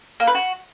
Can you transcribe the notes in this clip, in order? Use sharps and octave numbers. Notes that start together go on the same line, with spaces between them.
A#3
B4
F#4